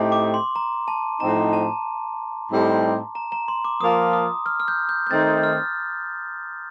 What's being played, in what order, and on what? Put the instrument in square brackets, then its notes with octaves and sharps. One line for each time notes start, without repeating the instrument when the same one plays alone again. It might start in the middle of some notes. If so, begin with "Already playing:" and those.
Already playing: [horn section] A2 A3 C4 D#4 G4
[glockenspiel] D6
C6
A#5
A5
[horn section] A2 F3 C4 D#4 [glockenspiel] A#5
[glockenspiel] A5
[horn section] A2 G3 C4 D#4 G4
[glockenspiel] A#5
A#5
C6
D6
[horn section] F3 A#3 F4 [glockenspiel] D#6
[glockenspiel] D#6
F6
F6
G6
G6
G6
[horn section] D#3 A3 C4 D#4 [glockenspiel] A6
[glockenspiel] F6